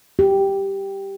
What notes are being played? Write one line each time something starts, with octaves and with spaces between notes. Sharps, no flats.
G4